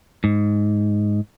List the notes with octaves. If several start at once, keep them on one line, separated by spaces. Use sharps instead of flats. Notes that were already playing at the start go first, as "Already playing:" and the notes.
G#2